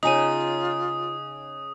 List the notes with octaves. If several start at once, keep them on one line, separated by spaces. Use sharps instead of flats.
C#3 D#4 F4 D#5 G#5 D#6 D#7